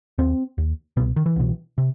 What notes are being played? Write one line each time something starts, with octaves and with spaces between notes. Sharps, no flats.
D#2 C4
D#2
C2 B2 B3
D#3
E3
C2 B2
C3